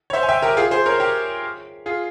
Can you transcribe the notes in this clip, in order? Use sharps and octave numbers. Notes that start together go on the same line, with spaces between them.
C#5
C5 E5
G#5
E5 G5
G4 A#4
F4 G#4
G#4 C5
A#4 C#5
G4 A#4
F4 G#4